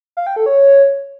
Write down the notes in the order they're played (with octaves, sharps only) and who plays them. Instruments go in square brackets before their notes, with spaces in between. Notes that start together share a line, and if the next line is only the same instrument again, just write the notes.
[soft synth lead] F5
G5
A4
C#5